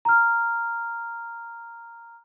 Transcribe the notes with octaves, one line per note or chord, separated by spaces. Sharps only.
A#5 F6